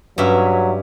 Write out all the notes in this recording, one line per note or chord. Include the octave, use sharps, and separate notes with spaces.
G2 F#3 C#4 E5